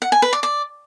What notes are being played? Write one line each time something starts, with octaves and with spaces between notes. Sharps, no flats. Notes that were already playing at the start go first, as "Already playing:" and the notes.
F#5
G#5
B4
D5
D5